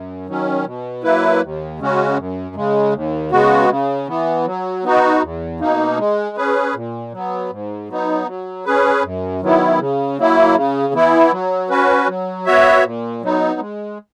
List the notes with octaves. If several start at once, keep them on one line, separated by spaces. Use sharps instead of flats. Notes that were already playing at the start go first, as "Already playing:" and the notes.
Already playing: F#2
D#3 F#3 C#4
B2
F#3 A#3 E4 B4
D#2
C#3 G#3 C#4 F#4
F#2
C#3 G#3
D#2
C#3 G#3 B3 F#4
C#3
E3 B3
F#3
B3 D#4 F#4
E2
B2 A#3 D#4
G#3
C#4 G#4 B4
A#2
F#3 B3
G#2
F#3 B3 D#4
F#3
C#4 G#4 B4
F#2
D#3 F#3 B3 E4
C#3
F#3 A#3 E4
C#3
E3 B3 E4
F#3
C#4 F#4 B4
F#3
B3 F#4 C#5 E5
A#2
F#3 B3 D#4
G#3